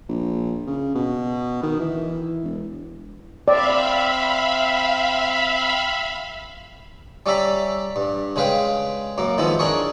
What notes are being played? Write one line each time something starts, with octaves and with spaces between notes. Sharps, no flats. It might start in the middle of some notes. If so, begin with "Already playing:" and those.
A#1
C#3
B2
D#3
E3
E1
C4 D5 E5 F5 B5
G3 C#4 D5 E5 A#5 B5
G2
C#3 G#3 B4 F5 G5
F#2 A#3
D#3 F3 G#3 B3 E4
D4 G#4 A#4 C#5